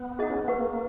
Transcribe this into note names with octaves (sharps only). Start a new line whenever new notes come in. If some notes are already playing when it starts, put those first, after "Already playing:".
Already playing: B3
D#4 G#4 D#5 F#5
C#4
B3
A#3 B4 F#5 C#6